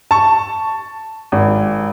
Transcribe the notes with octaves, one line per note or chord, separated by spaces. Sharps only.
A5 C#6
G#1